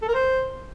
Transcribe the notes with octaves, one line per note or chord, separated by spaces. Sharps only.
A4
A#4
C5